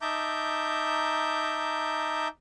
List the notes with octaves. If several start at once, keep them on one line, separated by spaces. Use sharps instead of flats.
D#4 E5 A5 A#5 D6 G6